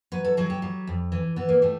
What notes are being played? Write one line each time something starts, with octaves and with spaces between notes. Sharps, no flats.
F#3 B4
A4
F#3 G#4
G4
G3
F2
E3
E3 B3
A#3
G3 A3